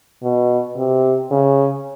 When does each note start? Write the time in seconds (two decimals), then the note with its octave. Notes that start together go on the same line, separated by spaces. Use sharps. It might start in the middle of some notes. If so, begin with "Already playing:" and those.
0.23 B2
0.77 C3
1.31 C#3